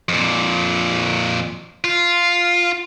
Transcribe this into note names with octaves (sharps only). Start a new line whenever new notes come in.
F2 A#2
F4